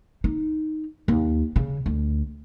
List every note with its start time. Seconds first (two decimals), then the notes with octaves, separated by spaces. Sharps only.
0.24 D#4
1.08 D#2
1.56 C#3
1.86 D2